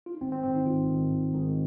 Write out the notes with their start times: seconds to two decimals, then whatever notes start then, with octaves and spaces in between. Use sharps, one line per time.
0.06 F4
0.14 D#4
0.21 G#1 C4
0.32 C4
0.43 G#2 D#3 C4
0.55 D#4
0.66 G#1 F4
0.88 G#2 D#3
1.11 G#1
1.33 G#2 D#3